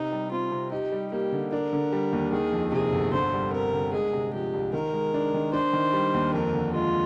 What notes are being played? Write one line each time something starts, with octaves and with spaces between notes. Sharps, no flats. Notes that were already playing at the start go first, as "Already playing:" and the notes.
Already playing: C3 D#4
G3
C4 F4
C3
D#4 G4
G3
A#3 G4
D3
D4 A#4
D3
G3
D#2
D#3 G#4
F2
C3 G#4
G1
D3 C5
G3
C4 A#4
D3
G#3 G#4
C3
F3 G4
C2
D#3 A#4
G#3
D4
D#3
D4 C5
D#3
G3
D#2
F2 A#4
D3
G#3 F4